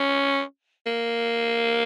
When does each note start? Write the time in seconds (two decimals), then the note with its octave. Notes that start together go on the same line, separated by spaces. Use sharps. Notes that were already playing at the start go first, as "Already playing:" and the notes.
Already playing: C#4
0.86 A#3